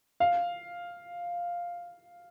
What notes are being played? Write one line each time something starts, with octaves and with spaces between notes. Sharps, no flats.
F5